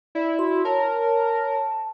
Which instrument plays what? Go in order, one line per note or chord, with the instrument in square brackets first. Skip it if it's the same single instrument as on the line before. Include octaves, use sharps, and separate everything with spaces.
[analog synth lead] E4 [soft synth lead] D5
[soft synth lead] F#4 [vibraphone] C6
[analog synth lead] A#4 [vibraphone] C#5 [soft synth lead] A5